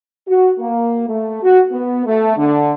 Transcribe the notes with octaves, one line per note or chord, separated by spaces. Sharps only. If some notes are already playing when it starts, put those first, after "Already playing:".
F#4
A#3
A3
F#4
B3
A3
D3